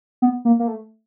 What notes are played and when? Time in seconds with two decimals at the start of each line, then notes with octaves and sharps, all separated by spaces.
0.22 B3
0.45 A#3
0.59 A#3
0.68 A3